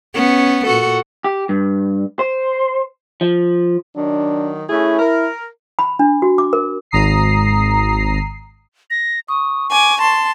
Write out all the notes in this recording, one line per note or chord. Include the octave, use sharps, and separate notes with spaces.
B3 C#4
A#2 F#4 A4
G4
G2
C5
F3
D#3 F#3 D4
A3 C#4 E4 G#4
A#4
B5
D4
F#4
D6
A#4
G#1 A#5 D#6 C7
A#6
C#6 D#6
G#5 D6
A5 C6